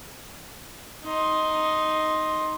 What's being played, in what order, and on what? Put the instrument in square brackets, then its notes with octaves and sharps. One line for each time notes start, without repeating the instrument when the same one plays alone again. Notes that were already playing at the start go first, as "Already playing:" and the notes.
[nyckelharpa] D#4 C6